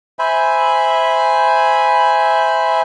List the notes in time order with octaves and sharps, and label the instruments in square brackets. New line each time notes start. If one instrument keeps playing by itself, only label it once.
[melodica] C5 E5 G#5 B5